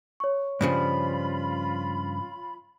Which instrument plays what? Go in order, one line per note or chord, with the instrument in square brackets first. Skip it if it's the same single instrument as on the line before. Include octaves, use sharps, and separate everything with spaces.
[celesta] C#5 C#6
[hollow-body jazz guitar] G2 C#3 F3 [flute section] F4 B5